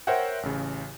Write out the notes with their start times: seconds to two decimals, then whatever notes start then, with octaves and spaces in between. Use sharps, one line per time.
0.07 A#4 C5 C#5 E5 F#5 G5
0.43 A1 C#3